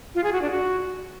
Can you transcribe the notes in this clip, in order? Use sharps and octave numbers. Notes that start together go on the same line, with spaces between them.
F4
G#4
F#4
D4
F#4